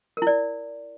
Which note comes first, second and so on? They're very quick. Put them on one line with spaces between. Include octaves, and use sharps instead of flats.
A#4 E4 D5